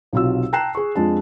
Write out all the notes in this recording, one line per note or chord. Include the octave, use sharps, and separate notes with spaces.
B1 C3 F4 F#4 E6
G5 A5 A#5 F#6 C7 E7
G#4 C#6
F2 G#3 D4 A5